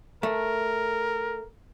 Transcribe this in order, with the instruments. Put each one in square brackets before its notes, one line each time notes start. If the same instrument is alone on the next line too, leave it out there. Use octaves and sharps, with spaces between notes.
[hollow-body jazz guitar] A3 [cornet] A#4